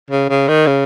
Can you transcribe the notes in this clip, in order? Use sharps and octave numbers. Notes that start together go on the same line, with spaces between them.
C#3
C#3
D#3
C#3